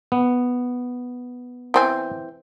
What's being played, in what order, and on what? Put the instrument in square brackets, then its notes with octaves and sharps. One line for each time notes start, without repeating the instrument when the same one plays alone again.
[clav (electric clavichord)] B3
[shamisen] E3 C4 G#5